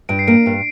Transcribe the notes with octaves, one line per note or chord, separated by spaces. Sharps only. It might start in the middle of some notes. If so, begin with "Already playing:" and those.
G2 D7
C7
A#3 D7
G2